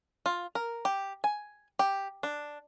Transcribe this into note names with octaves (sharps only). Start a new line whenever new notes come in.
F4
A#4
G4
G#5
G4
D4